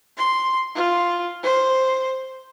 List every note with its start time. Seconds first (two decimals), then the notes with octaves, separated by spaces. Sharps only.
0.17 C6
0.75 F4
1.43 C5